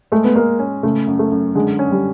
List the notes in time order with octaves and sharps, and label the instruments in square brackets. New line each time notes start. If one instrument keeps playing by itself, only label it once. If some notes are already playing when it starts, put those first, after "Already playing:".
[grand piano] G#3 [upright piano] A3
[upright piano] B3
[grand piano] G#3 [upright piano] A#3
[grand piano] C#4
[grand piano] C#3 [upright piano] A3
[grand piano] F#2
[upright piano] A3
[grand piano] F#2
[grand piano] D3 [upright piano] G#3
[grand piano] C#4
[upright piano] G3